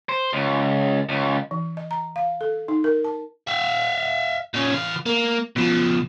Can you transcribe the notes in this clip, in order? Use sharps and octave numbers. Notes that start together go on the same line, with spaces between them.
C5
C#2
C#2
E3
D#5
A#5
F5
A4
D#4
A#4
A5
E5 F5
A#2 C#4
E3 F5
A#3
B2 F3